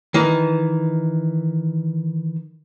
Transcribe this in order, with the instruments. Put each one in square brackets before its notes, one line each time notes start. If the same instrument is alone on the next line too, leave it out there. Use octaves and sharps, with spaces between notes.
[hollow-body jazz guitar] D#3 E3